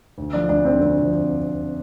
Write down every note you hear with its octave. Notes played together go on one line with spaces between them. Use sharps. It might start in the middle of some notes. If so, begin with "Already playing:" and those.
D2
D3 F3 D4
D2 D4
D3 F3 C4
D2 C4
D3 F3